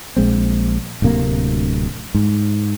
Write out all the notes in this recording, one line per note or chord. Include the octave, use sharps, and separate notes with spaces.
A#1 G#3 C4
D1 D2 C3 A#3
G#2